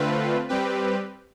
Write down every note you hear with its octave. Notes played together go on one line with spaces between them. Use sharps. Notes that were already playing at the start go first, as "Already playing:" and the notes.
Already playing: D3 A3 C4 F4 B4
G3 C4 G4 B4